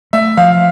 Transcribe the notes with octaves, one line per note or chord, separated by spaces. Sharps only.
A3 E5
F3 F5